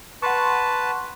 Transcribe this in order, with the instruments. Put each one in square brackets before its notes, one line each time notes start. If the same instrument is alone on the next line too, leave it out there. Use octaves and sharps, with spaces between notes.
[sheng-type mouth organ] B4 A5 [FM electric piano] F#5 C6 C#6